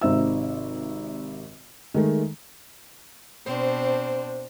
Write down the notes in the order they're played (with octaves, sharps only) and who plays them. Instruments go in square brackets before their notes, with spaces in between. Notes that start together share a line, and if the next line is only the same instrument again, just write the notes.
[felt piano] G#1 C3 D#4 C5 E5 E6
D#3 G#3 A3
[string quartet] B2 C4 D4 [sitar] C5